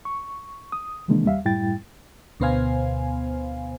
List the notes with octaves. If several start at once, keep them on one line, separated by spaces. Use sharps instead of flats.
C#6
D#6
C3 D#3 E3 G#3 A#3 D4
D#2 G3 E5 F5
F#2 A2 G3 E4 G5 A6
D2 B2 B3 C5 F5 G#5